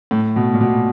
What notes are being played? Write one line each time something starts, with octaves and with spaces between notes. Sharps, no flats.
A2
B2
A#2
B2